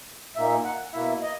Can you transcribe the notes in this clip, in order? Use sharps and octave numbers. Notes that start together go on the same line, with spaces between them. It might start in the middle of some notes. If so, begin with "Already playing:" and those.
A#2 A#3 D#4 E5
F#5
B2 A#3 E4 E5
D#5